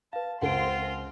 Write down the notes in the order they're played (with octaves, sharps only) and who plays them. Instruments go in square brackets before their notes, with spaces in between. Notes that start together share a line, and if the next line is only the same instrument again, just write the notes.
[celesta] B4 F5 [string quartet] A5
[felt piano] C#2 A#4 [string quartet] C4 C6 [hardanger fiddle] F4 [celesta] F#5 D7